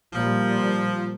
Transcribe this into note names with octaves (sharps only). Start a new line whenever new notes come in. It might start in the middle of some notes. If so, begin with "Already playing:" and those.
A#2 F3 G3